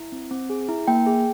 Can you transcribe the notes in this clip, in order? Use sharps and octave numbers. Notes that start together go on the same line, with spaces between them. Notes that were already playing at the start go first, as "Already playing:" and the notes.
Already playing: E4
C4
C4
G#4
E4
A#3 G5
G#4